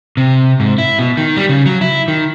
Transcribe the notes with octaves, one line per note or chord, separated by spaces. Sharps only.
C3
G#2
E4
B2
D#3
G3
C#3
F#3
E4
D#3